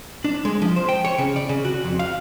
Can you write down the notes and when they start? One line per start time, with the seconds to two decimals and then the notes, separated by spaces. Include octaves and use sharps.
0.24 D4
0.45 G#3
0.62 F3
0.76 C5
0.89 G5
1.05 C#5
1.18 C#3
1.36 D5
1.49 C#3
1.65 F#4
1.85 F2
1.99 F5